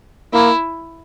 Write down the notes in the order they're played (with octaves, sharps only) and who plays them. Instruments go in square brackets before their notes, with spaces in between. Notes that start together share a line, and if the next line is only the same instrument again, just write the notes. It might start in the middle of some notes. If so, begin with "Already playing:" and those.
[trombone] A#3 [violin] E4